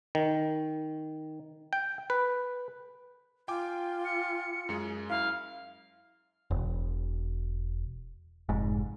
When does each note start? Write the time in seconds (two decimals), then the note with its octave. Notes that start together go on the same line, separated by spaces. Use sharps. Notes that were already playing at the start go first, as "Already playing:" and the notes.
0.15 D#3
1.73 G5
2.10 B4
3.48 F4 G5 G#5 D6
4.05 C#7
4.69 F#2 G#3 G#4
5.09 F#2 E4 F5
6.51 E1
8.49 F1 G#2